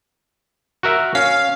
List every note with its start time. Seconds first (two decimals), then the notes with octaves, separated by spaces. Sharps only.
0.83 F#4 A#4 E5
1.15 C#4 F5 F6